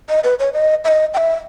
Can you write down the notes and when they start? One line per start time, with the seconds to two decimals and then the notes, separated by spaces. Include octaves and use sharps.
0.09 D#5
0.24 B4
0.39 C#5
0.54 D#5
0.85 E5
0.88 D#5
1.14 G5
1.17 E5